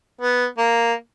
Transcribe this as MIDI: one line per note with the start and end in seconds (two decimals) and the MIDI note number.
0.21 0.46 59
0.58 0.93 58